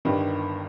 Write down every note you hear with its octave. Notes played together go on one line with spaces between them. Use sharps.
G1 G2 D#3